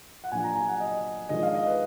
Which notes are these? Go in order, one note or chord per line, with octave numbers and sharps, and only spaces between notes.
F#5
A#2 F#3 D4 F4 G#5
A#5
G#5
F#5
D#5
D#3 G#3 D4 F4 D#5
F5
D#5
B4